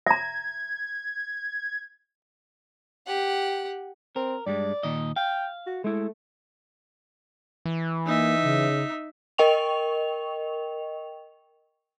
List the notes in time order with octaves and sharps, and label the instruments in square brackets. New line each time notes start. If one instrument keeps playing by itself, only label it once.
[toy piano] E5 A#5 [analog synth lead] G#6
[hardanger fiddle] G4 F#5
[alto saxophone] C4 [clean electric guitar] A#4
[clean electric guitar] G2 G3 G#3 [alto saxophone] D5
[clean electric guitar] A#2 D#3 D#5
[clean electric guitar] F5 [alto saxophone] G5
[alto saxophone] F#4
[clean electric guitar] G#3 E4 [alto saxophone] A3
[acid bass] E3
[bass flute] A#3 [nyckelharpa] D#4 E5
[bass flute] C#3
[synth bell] A#4 D#5 G5 C#6 F7